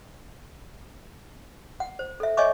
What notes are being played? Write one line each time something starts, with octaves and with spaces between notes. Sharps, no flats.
F#5
C5
A4 E5
C#5 D#5 E5 G#5 C#6 D6